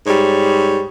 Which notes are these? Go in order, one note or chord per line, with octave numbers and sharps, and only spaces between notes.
G#2 G3 C#5